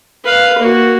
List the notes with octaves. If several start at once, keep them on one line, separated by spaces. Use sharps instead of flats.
B4 F5
A#3 F#4